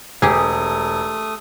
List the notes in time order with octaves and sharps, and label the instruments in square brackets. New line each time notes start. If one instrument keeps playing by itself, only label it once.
[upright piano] E1 [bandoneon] A3 D#6 [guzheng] G4 G#4